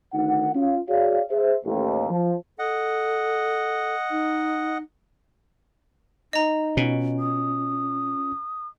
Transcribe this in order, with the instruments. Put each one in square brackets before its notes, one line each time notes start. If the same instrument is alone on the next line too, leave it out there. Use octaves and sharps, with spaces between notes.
[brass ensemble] D2 D#3 D#4 F#5
C#4 F4
F#4 G#4 C#5 D5 F5
G#4 C5 E5
A1 D#2
F3
[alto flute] A4 [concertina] D#5 F#5
[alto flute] D#4
[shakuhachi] D#4 [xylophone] D#5 A#5
[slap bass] B2 [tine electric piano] C#4 F4
[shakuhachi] D#6